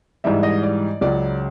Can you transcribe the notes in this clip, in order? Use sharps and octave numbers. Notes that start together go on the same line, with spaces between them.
G#2 E3 G3 E5
D#5
D5
C#2 C#3 F#3 D5